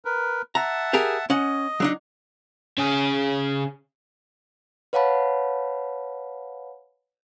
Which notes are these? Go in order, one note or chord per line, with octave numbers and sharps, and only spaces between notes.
A#4 B4
E5 F#5 A5 A#5
G4 G#4 A#4
C#4 D#5 F#5
F#3 D4 D#4
C#3 G#4
B4 C#5 F5 F#5 A5 B5